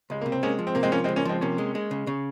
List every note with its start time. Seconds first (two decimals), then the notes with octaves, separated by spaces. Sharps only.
0.10 C#2 G#3
0.21 C3 A#3
0.32 C4
0.43 G#3 A#3 C#4
0.59 F3
0.67 C4
0.75 C3 A#3
0.83 G#3 C4
0.92 F3 A#3 C#4
1.04 G#3 C4
1.09 C#2
1.16 A#3 C#4
1.25 F3 G#3 C4
1.41 C3 A#3 C#4
1.58 G#3
1.75 G#3
1.91 C#3
2.07 C#3